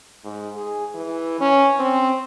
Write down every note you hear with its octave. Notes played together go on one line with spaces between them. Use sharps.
G#2
G#4
E3
C#4
C4